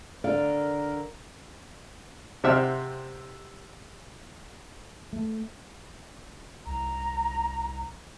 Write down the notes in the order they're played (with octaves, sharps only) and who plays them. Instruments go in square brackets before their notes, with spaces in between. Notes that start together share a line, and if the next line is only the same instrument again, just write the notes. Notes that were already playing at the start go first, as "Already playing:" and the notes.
[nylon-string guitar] D3 D5 F5 [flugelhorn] A#4
[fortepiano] C3 C4 E5 F#5 E6 F6
[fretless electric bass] A3
[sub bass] C2 [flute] A#5